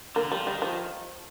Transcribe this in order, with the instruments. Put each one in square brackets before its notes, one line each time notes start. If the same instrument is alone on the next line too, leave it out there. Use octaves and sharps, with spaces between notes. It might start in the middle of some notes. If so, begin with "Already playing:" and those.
[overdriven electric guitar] D3 [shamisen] A#3
[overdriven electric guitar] F3 [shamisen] G3
[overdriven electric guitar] D#3 [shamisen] G3
[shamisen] F3